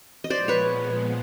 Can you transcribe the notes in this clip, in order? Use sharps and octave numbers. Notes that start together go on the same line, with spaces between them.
D#5
A#2 F3 G#3 B3 C5 D5
B4 C#5